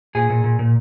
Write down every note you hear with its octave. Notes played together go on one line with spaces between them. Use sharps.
A#2 G#4 G#5
A#2
A#2
A#2